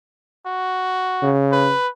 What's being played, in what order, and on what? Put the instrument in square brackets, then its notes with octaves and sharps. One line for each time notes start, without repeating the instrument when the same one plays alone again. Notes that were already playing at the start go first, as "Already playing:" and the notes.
[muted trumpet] F#4
[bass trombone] C#3
[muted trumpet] B4